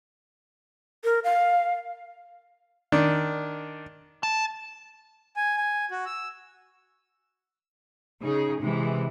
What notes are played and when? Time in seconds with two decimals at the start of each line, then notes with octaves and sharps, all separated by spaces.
1.04 A#4
1.24 F5
2.92 D#3 D4
4.23 A5
5.36 G#5
5.57 G#5
5.91 F#4
6.06 E6
8.23 C#3 D#4 G#4
8.61 C3 E3 G#3